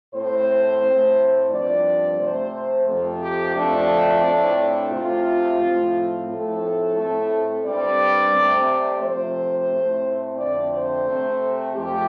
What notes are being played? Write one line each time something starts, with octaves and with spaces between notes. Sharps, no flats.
A2 A3 C4 C5
A2 A3 C4
G2 F3 C4 D5
C3 A3 C4 C5
F2 C3 F3 A4
G4
F2 F3 A3 C4 D4
A2 A3 C4
C3 A3 C4 F4
A2 F3 A3 C4
A2 F3 A3 C4 A4
A2 A3 C4
G2 G3 C4 D5
C3 A3 C4
C3 F3 A3 C4 C5
A2 A3 C4
F2 D3 A3 C4 D5
C5
C3 A3 C4
F2 F3 A3 G4